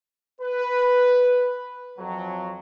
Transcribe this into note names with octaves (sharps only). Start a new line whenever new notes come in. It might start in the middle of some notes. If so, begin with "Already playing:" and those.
B4
F2 F#3